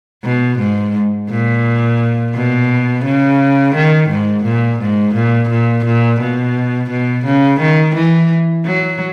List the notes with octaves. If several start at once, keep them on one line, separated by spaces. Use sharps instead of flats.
B2
G#2
A#2
B2
C#3
D#3
G#2
A#2
G#2
A#2
A#2
A#2
B2
B2
C#3
D#3
E3
F#3